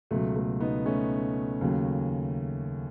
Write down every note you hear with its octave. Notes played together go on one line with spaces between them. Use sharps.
C#2 B2 F#3 A3
A3
B3 D#4
A3 C#4
D#2 C#3 F#3